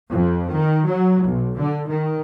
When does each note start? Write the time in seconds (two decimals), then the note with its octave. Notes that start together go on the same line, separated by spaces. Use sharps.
0.11 F2
0.51 D#3
0.88 F#3
1.25 B1
1.58 D3
1.88 D#3